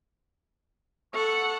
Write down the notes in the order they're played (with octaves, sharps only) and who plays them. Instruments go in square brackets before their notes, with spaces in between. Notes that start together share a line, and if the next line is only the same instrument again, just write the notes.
[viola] A4 F#5 [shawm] C#6